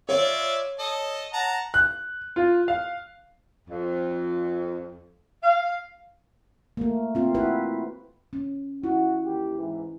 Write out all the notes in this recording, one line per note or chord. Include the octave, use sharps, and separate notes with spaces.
F4 C#5 D5 E5
A4 D#5
F#5 A5 A#5
F#6
F4
F5
F2
F5
A3 A#3
C4 F4
E4 F#4 B4
C#4
E4 F#4
D#2 G4
G#2 E3